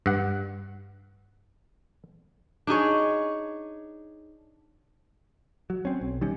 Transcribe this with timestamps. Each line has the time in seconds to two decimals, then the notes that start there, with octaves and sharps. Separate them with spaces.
0.06 G2 F#5
2.67 D4 D#4 G#4 C#5
5.70 F#3
5.85 C4 C#4
6.01 B1
6.21 D#3 G3 C#4